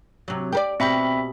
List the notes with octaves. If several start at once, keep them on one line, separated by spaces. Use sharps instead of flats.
C3 F#3
G4 A#4 D5
B2 C4 G4 E5 B5